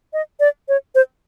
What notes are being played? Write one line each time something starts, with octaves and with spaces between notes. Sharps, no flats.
D#5
D5
C#5
C5